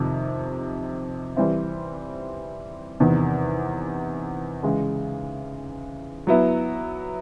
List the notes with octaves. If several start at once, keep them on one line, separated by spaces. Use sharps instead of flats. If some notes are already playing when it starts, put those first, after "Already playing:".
Already playing: F2 C3 D#3
E3 G3 C4 E4
E2 C3 D#3
C#3 E3 G#3
F#3 B3 E4